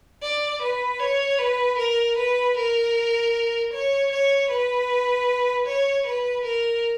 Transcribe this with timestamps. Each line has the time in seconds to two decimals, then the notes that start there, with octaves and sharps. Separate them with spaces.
0.23 D5
0.62 B4
1.00 C#5
1.39 B4
1.78 A#4
2.17 B4
2.56 A#4
3.73 C#5
4.12 C#5
4.50 B4
5.66 C#5
6.06 B4
6.44 A#4